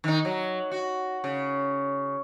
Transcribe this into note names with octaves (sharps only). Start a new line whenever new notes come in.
D#3 D#4
F#3
F#4
C#3